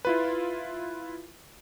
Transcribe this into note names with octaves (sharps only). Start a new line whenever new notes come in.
E4 F4 B4